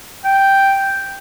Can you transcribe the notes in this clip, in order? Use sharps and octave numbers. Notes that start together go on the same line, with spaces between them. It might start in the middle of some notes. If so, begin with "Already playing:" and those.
G5